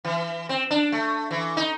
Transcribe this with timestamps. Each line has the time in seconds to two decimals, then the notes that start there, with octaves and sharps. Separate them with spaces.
0.05 E3
0.49 C4
0.71 D4
0.92 A3
1.31 E3
1.57 D#4